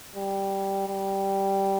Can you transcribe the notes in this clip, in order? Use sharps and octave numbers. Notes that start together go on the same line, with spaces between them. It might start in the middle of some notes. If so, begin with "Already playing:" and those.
G3
G3